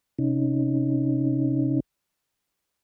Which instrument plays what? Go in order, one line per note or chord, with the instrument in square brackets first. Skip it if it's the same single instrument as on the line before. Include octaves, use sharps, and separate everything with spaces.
[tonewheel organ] C3 C#4 D#4